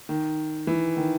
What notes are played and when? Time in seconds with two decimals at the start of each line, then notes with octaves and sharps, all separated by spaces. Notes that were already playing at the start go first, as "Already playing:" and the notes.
0.09 D#3
0.67 E3
0.97 D#3